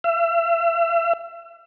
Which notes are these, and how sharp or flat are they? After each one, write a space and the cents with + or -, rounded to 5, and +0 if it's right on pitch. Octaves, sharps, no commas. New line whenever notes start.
E5 +40